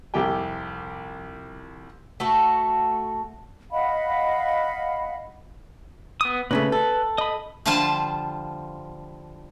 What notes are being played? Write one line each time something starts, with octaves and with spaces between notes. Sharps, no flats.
C2 F2 C3 G4 G5 G#5
A3 F#4 A4
D#5 F5 F#5 B5
B3 D#6
A#2 C#3 A3 B4
A4
D#5 B5
D3 F3 G3 F4 C5 A5